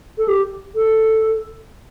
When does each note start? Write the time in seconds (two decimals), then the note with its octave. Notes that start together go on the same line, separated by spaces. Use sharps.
0.18 A4
0.28 G4
0.75 A4